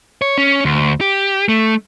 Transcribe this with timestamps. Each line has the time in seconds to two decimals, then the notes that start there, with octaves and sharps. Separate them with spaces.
0.22 C#5
0.38 C#4
0.65 D2
1.01 G4
1.49 A3